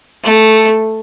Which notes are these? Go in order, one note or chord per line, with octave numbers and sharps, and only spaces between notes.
A3